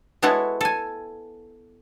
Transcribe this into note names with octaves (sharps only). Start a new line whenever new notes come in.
G#3 B3 E4 F#4 A4 C#5
A4 G#5